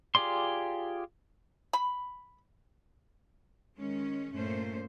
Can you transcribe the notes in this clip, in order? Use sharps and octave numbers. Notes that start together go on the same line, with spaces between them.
F4 G4 G#4 D5 C6
B5
D#3 G#3 C#4
G2 A#2 A3 C#4 C5